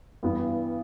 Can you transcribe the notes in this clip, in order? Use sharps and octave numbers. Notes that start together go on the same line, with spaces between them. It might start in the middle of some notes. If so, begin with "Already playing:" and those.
G2 E3 B3